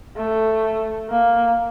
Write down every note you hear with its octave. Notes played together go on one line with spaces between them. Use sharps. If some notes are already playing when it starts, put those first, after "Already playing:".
A3
A#3